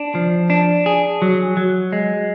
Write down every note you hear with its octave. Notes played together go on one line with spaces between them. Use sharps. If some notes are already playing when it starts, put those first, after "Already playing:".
Already playing: D4
F3
D4
G#4
F#3
F#3
G#3